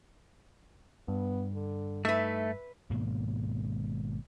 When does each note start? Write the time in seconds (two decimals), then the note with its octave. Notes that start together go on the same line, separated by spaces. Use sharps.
1.08 G2 B3
1.54 D3
2.05 A3 D#4 B4 E5
2.90 G#1 G#2 B2 A#3